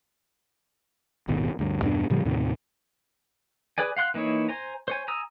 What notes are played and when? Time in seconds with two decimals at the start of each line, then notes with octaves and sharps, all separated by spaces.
1.28 D#1 G#1 B2 D#3
1.59 D2 G2
1.81 E2 G2 B2 D4
2.10 A2 C#3 F3 G3
2.25 D#2 A2 C3 D#3
3.78 G#4 B4 D5 G#5
3.97 F5 F#5 C6 F#6
4.14 E3 A#3 D#4 E4 C#5
4.49 C5 G#5 A#5
4.88 C5 C#5 G#5
5.08 G#5 A#5 D#6 E6